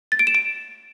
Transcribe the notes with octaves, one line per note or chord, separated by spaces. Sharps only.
A6
D7
E7
D7